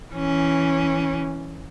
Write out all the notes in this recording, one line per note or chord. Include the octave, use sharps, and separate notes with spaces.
E3 C#4